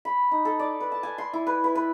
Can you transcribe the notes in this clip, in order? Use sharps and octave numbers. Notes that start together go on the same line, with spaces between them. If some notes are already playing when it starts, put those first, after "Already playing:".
B5
D#4
A4
D5
B4
A5
G#5
C6
E4
B4
B4
B4